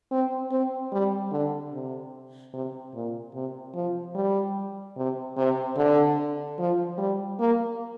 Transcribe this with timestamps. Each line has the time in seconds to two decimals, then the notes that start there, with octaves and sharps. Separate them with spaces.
0.11 C4
0.51 C4
0.92 G3
1.31 D3
1.72 C3
2.53 C3
2.94 A#2
3.34 C3
3.74 F3
4.15 G3
4.97 C3
5.37 C3
5.76 D3
6.59 F3
6.98 G3
7.39 A#3